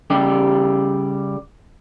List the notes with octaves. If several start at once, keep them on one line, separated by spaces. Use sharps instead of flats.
C#3 G3 G4